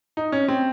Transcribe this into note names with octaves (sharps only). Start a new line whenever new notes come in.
D#4
C#4
C4